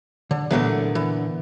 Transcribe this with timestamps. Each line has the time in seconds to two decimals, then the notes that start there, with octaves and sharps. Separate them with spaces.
0.31 D3
0.50 A#2 D3 E3 F#3 A3 B3
0.95 E3